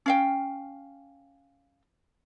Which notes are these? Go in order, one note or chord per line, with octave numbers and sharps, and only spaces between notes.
C#4 F5 G5